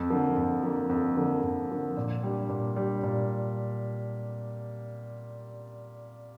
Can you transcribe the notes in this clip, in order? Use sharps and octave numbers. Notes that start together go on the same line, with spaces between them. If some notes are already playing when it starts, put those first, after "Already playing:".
Already playing: F2
D3 F3 A#3
F2
D3 F3 A#3
F2
D3 F3 A#3
F2
D3 F3 A#3
A#2
G3 D4
A#2
G3 D4
A#2